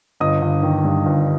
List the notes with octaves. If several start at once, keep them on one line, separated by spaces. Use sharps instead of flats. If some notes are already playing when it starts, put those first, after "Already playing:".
G1 D#5 D#6
G1
D#3
G2
G1